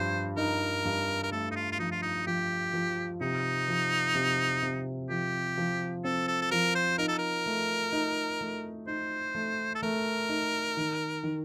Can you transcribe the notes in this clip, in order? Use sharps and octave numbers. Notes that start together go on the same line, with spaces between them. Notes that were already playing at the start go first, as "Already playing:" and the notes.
Already playing: G2 F3 C5
D#4 A#4
G2
A#4
A3 A4
D#4
F4
F4
F3 D#4
F4
D#4
F3 G4
F3
C3 D#4
F3
C3
C3
F3 G4
F3
C4 A4
A4
A4
F3 A#4
C5
D#4 A#4
A4
A#4
A3
D#4
A3
D#4 C5
A3
A4
A3 A#4
D#4
D#3
D#3